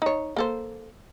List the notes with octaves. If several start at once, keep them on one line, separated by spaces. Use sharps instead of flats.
D#4 C#5
A#3 A4 C5